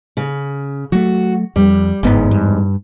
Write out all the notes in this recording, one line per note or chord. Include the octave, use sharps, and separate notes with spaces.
C#3
F#3 A3 F#4
F2 G3
G1 E2 G#2 B3
G2